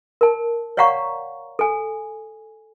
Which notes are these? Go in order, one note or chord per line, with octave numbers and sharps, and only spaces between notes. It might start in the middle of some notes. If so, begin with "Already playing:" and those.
A#4 A5
C#5 D5 F5 F#5 A#5 C#6
A4 G#5